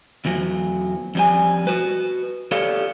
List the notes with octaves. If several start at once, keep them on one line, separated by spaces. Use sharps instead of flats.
E2 E3 F#3
F2 G3 G#5
F#4 B4
G4 A4 C#5 D5 F5